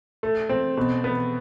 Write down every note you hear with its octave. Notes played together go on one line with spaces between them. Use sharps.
A3
C4
B2
B3